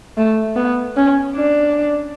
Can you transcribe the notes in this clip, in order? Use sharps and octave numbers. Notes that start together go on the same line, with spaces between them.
A3
B3
C#4
D4